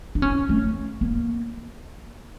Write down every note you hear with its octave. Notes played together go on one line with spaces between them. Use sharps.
D4
C#4
A3
A#3